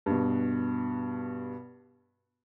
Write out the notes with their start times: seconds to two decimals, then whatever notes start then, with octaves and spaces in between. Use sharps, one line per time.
0.06 G2 B2